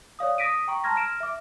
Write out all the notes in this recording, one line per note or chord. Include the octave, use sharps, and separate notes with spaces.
C#5 D5 F5 D#6
D#6 A#6 B6 D7 D#7
G5 A#5 C#6
A5 A#5 C6 F6 G#6 A#6
F6 A#6 D7 E7
E5 D6